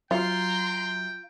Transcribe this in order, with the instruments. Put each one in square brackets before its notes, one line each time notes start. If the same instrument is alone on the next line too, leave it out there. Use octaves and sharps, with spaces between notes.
[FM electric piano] F#3 E5 [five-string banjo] F4 [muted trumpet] G5 [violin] A#5 C6